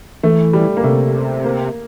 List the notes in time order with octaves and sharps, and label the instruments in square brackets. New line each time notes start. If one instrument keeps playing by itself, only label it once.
[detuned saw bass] E3 [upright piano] A3
[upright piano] G3
A#3
[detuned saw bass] C3 [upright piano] A3
[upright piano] A#3